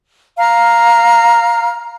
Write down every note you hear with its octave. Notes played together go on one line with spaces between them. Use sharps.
F5 A#5 F6